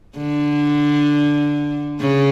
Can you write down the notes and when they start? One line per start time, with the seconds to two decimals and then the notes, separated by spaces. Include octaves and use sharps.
0.17 D3
2.01 C#3